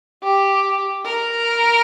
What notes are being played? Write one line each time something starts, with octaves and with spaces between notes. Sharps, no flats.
G4
A#4